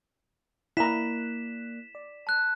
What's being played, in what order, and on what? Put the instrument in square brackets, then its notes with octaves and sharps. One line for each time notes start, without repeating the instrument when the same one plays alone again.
[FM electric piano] A#3 D5 F#6 [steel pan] E4 A#5 [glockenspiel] B6 E7
[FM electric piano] D5
[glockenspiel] A5 F#6